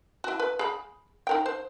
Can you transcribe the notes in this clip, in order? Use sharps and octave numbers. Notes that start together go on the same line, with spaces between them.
E4 F#4
B4
G#4 B5
D#4 A#4 G5
C5